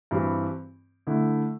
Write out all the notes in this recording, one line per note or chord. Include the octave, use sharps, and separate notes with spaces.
G2 E3 G3 C4
D3 A3 E4